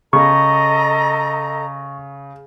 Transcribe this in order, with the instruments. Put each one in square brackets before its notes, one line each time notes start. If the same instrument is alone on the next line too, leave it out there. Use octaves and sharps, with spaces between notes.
[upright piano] C#3 [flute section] A4 D#5 A#5 [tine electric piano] C#6